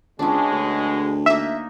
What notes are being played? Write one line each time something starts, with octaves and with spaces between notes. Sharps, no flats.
C#2 B2 G#3 C#4 D4
D2
A#3 D#4 E5